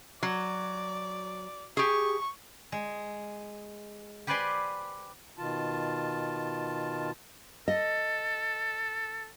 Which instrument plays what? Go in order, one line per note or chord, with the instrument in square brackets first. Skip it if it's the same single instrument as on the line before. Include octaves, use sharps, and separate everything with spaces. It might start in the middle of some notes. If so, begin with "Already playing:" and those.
[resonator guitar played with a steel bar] F#3 [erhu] D5
[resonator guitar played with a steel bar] G4 G#4 [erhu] C#6
[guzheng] G#3
G4 B4 C5 D5 G#5 C6
[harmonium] B2 D#3 F4 A5
[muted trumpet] A4 [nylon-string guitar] D#5